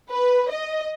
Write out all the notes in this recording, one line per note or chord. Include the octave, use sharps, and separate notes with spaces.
B4
D#5